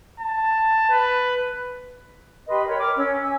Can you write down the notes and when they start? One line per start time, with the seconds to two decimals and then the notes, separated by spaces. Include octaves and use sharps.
0.20 A5
0.90 B4
2.47 G4 B4 D#5 C6
2.67 A#4 B4 C#5 G5
2.79 D6 F6
2.97 C#4 C#5 E6
3.20 G#5 E6